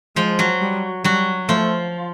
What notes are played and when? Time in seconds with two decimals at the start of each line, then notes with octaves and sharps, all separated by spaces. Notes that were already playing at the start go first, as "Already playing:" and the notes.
0.16 F3 G#3 F4
0.39 F#3 F#4
0.61 G3
1.04 F#3 G3 F#4
1.48 F3 A3 F4